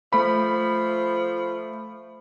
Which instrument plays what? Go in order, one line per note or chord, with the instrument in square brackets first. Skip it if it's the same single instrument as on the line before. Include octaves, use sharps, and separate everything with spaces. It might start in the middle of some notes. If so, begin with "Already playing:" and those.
[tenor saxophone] F3 [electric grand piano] A3 B5